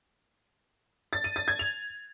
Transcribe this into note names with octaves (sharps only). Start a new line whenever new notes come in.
A6
D#7
A6
G#6
F7